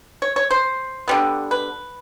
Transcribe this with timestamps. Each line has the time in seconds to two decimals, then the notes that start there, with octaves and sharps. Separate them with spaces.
0.22 C#5
0.36 C#5
0.51 C5
1.08 D3 G3 B3
1.51 B4